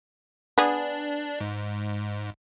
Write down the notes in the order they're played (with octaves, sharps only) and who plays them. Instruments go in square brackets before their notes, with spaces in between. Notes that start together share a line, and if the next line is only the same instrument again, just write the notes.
[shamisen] B3 G#4 [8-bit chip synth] D4
[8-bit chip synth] G#2